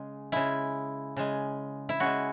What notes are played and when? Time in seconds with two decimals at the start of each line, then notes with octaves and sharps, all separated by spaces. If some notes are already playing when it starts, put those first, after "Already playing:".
Already playing: C#3 G#3
0.32 C#3 G#3 E4
1.17 C#3 G#3
1.89 E4
2.00 C#3 G#3 F#4